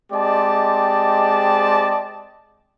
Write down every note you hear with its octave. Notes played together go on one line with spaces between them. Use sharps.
G#3 C4 G4 D5 D#5 A5